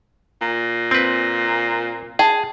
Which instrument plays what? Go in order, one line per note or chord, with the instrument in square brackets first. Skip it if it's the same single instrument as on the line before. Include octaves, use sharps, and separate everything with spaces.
[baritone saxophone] A#2
[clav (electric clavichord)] C4 B4
[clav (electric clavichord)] G#4 [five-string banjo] G5 A5